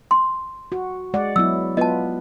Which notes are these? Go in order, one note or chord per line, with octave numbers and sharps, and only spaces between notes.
C6
F#4
G#3 D5 F#5
F#3 B3 E4 E6
B3 F4 B4 D#5 A5